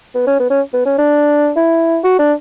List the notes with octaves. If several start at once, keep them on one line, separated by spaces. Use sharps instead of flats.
B3
C#4
B3
C#4
B3
C#4
D4
E4
F#4
D4